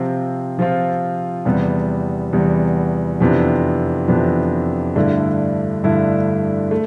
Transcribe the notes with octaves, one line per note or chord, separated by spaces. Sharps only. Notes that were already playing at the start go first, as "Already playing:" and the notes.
Already playing: C3 F3 C4 F4
C3 F3 C4 F4
E2 C3 G3 B3
E2 C3 G3 B3
F2 C3 E3 B3 D4
F2 C3 E3 B3 D4
G2 D3 A3 E4
G2 D3 A3 E4
A3